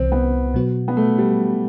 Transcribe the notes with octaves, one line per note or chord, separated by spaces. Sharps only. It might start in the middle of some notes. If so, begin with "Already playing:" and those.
Already playing: C2 C3 E3 C4
B3
B2 F#3 B3 F#4
B3
A3
G3